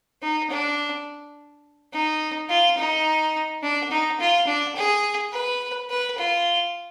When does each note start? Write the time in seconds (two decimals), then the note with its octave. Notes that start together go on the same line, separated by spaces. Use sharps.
0.22 D#4
0.50 D4
1.93 D#4
2.50 F4
2.78 D#4
3.63 D4
3.91 D#4
4.20 F4
4.47 D4
4.76 G#4
5.32 B4
5.90 B4
6.18 F4